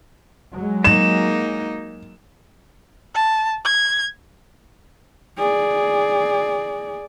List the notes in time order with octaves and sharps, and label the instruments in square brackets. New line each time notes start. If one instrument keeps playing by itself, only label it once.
[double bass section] F#3 G#3
[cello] A#3 D#4 [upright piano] E7
[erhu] A5
G#6
[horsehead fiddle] G#4 D5